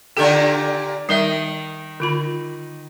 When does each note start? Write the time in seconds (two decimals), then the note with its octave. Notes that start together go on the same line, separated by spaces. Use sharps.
0.17 A#2 D3 G4 A4 D5
1.09 D#3 G3 A#4 E5
2.00 D3 F4 B5